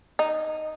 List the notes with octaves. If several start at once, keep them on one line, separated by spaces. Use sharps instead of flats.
D#4